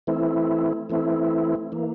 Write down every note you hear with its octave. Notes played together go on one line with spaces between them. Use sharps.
E3 A3 C4 E4
E3 A3 C4 E4
E3 A#3